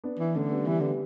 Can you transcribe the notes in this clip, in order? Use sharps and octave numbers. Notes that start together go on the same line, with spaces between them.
B3 D4
E3
D3 A3 C#4
G3 B3
E3 G3 B3
D3 G3 B3